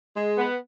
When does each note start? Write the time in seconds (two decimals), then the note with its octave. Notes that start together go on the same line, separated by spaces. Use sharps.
0.15 G#3
0.38 B3